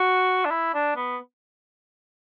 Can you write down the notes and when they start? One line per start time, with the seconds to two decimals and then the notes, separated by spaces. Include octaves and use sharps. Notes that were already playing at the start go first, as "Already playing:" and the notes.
Already playing: F#4
0.45 D4
0.50 E4
0.74 D4
0.96 B3